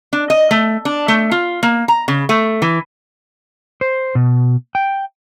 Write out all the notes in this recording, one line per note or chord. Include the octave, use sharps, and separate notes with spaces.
D4
D#5
A3
D4
A3
F4
A#3
A#5
C#3
A3
E3
C5
B2
G5